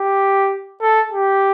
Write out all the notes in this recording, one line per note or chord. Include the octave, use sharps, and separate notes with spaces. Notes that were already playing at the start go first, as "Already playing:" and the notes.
Already playing: G4
A4
G4